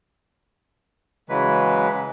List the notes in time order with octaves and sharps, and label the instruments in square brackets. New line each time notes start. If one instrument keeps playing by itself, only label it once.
[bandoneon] C#3 E3 F#3 G#3 B4